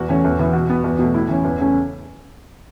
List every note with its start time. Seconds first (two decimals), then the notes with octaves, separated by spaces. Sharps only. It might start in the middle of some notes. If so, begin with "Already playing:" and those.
Already playing: E2 F#4
0.09 E3 A3 C#4
0.24 E2
0.39 E3 B3
0.53 B2 F#4
0.69 B3
0.84 E2
0.99 B2 A3
1.14 A2 E4
1.29 E3 C#4
1.44 E2
1.59 C#3 A3 C#4